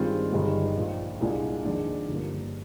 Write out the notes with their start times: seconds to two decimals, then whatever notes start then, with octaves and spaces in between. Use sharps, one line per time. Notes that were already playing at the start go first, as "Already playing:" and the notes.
Already playing: G2 D#3 G#3 C4 F4
0.32 G1 G2 D#3 G#3
0.77 A#1 A#2 F3
1.20 C2 A#2 G#3 D4 G#4
1.65 F2 D#3 G#3 D4
2.09 G1 G2 F3 A#3